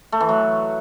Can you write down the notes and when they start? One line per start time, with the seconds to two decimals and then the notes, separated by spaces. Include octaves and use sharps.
0.12 A3
0.21 E3
0.29 F#3